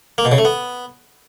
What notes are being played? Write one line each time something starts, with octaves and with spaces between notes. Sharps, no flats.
A#3
B2
C#3
A3
B3